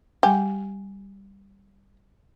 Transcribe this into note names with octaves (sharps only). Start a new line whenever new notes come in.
G3 G4 F#5 G#5